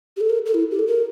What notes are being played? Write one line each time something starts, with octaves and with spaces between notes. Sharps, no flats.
G4
A4
A#4
A4
E4
G4
A4
A#4